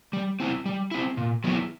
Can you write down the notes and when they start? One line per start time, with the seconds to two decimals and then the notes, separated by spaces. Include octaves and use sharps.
0.13 G3
0.40 C4 E4
0.66 G3
0.91 C4 E4
1.17 A#2
1.44 F#3 B3 E4